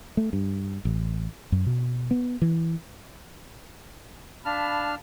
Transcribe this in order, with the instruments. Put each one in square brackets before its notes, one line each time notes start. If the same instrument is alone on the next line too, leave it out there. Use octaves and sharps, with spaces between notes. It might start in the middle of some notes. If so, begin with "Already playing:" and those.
[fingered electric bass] A3
G2
A1
F#2
B2
B3
E3
[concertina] D4 F6 [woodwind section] F5 A5 B5